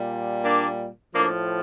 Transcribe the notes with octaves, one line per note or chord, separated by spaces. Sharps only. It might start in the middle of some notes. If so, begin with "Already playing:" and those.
Already playing: A#2 G3
A#3 D4
A2 F3 A#3 D4